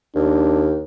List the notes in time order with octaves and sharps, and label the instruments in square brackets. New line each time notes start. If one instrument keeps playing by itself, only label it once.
[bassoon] D#2 [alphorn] D4